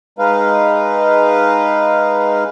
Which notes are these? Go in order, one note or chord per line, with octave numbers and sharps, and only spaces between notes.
G#3 D#4 B4 F5